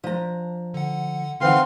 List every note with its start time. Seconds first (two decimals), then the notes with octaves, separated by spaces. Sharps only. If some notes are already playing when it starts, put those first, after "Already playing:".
0.04 F3 D4 A#5
0.74 D3 F#5
1.41 D3 E3 C4 D#4 B4 F5 F#5 C6